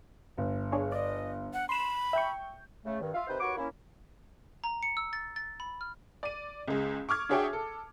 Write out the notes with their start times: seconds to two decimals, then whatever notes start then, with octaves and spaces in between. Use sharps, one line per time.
0.38 G1
0.72 D4 G#4 C#5
0.92 D5 D#5
1.53 F#5
1.69 B5 C6 E7
2.13 E5 G5 C#6 G6
2.85 C#3 A3
3.01 G2 D#3
3.14 F4 E5 F5
3.28 C3 D#3 B4 C5
3.40 D#2 F#4 B4 C#5 C#6 D6
3.57 A#3 C#4 E4
4.64 A#5
4.83 C#7
4.97 E6
5.13 A6
5.36 A6
5.60 B5
5.81 F6
6.23 D5 D#7
6.68 C#2 G#3
7.09 C#6 D6 F6 G#6
7.29 D4 F#4 G#4 C#5 E5 G5
7.53 A4